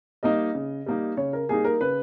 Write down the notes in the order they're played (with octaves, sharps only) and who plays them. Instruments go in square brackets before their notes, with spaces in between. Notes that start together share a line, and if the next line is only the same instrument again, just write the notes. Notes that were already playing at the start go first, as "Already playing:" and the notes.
[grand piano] G3 A#3 D#4 [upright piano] D#5
[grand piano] C#3
G3 A#3 D#4
[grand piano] C#3 [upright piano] C#5
[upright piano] A#4
[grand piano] G3 A#3 D#4 [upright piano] G#4
[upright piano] A#4
[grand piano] C#3 [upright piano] B4